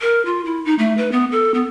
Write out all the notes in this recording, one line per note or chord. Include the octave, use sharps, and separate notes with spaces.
A#4
F4
E4
D#4
A3
B4
B3
A4
B3